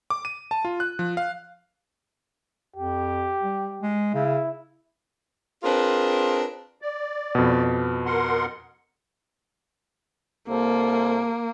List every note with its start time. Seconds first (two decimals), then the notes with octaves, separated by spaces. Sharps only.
0.10 D6
0.25 D#7
0.51 A5
0.65 F4
0.80 F#6
0.99 F3
1.17 F5
2.76 F2 G4
3.42 G3
3.82 G#3
4.14 C#3 E4
5.64 C4 D4 F4 G#4 A#4 B4
6.82 D5
7.35 F2 B2
8.06 A#4 F#5 C6
10.49 C2 A#3 A4 C5